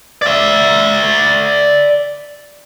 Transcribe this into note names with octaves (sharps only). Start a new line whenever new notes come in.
D5 E5